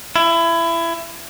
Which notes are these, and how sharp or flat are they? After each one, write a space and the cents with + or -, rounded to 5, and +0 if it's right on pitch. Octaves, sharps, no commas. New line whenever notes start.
E4 +25